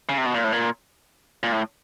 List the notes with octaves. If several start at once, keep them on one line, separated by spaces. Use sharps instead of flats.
C#3
C3
B2
A#2
A2
A#2
A#2
A2